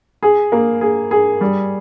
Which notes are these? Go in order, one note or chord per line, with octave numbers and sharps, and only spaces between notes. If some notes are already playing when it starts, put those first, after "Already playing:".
G#4
A#3
G#4
G#4
G3